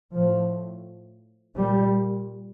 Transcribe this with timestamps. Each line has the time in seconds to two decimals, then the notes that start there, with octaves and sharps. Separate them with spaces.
0.13 A2 F3
1.56 A#2 G3